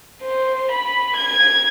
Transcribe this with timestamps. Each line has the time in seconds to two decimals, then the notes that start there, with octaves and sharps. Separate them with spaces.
0.22 C5
0.71 B5
1.17 G#6